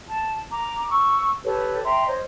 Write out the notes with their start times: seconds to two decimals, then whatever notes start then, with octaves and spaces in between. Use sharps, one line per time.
0.09 A5
0.51 A#5 D6
0.89 C#6 E6
1.43 G4 A4 B4 C#5
1.84 E5 G5 A#5 C6
2.06 C5 C#5 D#5